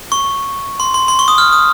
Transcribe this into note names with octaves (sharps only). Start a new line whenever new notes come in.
C#6
C6
C6
C6
C#6
D#6
F6
D#6